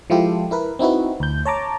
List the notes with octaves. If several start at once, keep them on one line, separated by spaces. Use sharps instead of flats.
F3 G#3 E4 F4 G4 A4
E4 A#4 B4
C4 D#4 E4 F#4 B4
D2 G6
C#5 A5 A#5 D6